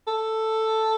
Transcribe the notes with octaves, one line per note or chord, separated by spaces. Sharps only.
A4